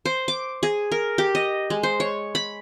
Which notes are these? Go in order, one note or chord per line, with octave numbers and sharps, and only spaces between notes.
C5
D6
G#4
A#4
G4
D#5
G#3
C5
C#5
B5